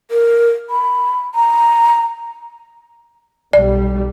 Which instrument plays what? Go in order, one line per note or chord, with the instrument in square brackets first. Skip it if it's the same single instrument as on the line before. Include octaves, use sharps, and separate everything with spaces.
[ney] A#4
B5
A#5
[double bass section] B1 G3 [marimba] D5